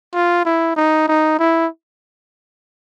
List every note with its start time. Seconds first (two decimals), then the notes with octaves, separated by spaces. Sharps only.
0.14 F4
0.45 E4
0.76 D#4
1.08 D#4
1.39 E4